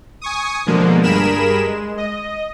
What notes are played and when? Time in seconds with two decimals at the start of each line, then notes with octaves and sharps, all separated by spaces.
0.21 G#5 C#6 D#6
0.66 B2 D3 F3 G#3 A#3
1.03 G2 G#4 A#4 B5 E7
1.61 G#3
1.97 D#5